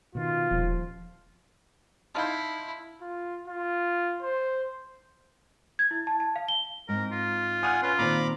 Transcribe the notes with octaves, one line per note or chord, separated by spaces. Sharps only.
B2 D#3 F4
D#1 F3
D#4 E4 F5 A5 C6 F6 G6
F4
F4
C5
G#6
E4
A5
A5
F5
G7
G#2 C4 A#4
F4
F#5 G#5 D#6 F6 F#6
C#4 F4 B4
A#2 D#3 C4 A#5 B5 D6